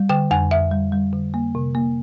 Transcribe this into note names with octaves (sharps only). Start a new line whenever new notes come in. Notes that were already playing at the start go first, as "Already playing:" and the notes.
Already playing: G3
D3 G5
F2 G#5
F2 E5
G3
G3
D3
A#3
C3
A#3